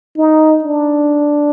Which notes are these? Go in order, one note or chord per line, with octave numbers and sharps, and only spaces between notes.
D#4
D4